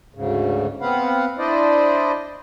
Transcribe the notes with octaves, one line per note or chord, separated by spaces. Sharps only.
D2 G#2 C#3
B3 C4 B4 F5 F#5
D4 E4 C5 D5 D#5